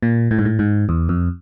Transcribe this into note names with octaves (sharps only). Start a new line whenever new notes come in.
A#2
A2
G#2
A2
G#2
E2
F2